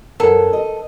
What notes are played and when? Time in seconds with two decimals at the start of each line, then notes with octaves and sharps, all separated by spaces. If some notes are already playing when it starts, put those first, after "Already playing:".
0.20 F#2 E3 A4 A#4 F#5 A#5
0.53 D#5